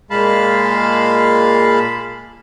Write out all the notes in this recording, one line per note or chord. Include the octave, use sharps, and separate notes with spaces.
A#2 G#3 F5 A5 B5